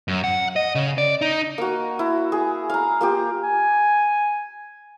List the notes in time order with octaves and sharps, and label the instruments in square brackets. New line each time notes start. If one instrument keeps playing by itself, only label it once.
[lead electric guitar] F#2
F#5
D#5
C#3
D5
D#4
[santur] A#3 F#4
E4
G#4
F5 A#5
A#3 F4 G4
[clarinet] G#5